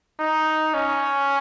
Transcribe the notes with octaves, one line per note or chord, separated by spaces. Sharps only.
D#4
C#4